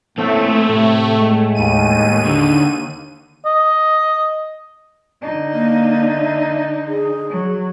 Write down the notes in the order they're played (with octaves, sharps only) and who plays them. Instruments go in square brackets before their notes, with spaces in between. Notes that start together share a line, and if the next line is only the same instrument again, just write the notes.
[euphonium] A2 [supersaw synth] A3 [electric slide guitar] A#3 C4
[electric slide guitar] A2 [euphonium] C3
[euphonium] G#3
[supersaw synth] D#2 D#7
[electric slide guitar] D3
[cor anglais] D#5
[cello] D3 D#4
[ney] A#3
E5
G#4
[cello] F#3